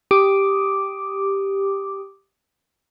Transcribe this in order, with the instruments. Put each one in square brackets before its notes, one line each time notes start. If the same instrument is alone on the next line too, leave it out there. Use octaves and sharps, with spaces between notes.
[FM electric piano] G4 D6 D#6